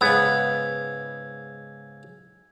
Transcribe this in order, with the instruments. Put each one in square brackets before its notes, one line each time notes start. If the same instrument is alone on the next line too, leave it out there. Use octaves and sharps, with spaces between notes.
[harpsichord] G#2 C#3 [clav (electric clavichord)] B3 [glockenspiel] E6 G#6